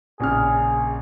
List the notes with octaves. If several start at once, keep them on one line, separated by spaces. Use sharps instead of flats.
A#1 C#3 G#4 F6